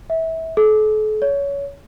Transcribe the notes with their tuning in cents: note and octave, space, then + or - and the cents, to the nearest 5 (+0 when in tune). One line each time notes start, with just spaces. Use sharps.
E5 -25
A4 -40
C#5 +20